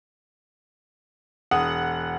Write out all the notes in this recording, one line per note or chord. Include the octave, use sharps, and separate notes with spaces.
E1 F#5 D#6